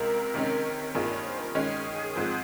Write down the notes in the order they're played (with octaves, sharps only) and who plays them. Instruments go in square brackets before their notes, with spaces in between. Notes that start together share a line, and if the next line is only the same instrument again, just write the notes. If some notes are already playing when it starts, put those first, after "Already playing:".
Already playing: [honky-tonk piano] C#2 C3 G#3 [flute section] A#4
[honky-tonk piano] C3 D#3 G#3 C#4
[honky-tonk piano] G2 D#3 A#3 F4 G#4 [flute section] A#4
[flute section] C#5
C5
A#4
[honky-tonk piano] D#3 G#3 C#4 [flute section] G#4
[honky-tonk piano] G#2 F3 C4